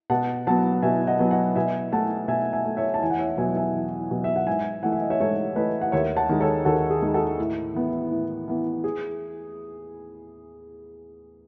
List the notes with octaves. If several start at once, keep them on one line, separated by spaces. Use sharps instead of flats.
B2 F#5 A5
F#3 B3 F#5 A5
B2 E5 G#5
D#5 F#5
F#3 B3
D#5 F#5
B2 E5 G#5
A3 F#5 A5
B2 E5 G#5
E5 G#5
A3
C#5 E5
A5
E2 G#5
F#5
C#5 E5
B2 F#3 E5 G#5
E5 G#5
E2
B2 F#3
E5
F#5
G#2 E5 G#5
E3 A3 F#5
E5
D#5
C#5 E5
G#2 A4 C#5
E3 A3 B4 D#5
F#5
D#2 C#5 E5
F#5 A5
D#3 G#3
A4 C#5
D#2 F#4 A4
G#4
D#3 G#3
F#4 A4
A2
E3 B3
A2
E3 B3
G#4